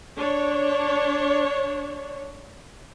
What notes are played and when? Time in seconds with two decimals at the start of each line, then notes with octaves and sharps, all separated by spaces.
0.17 D4 C#5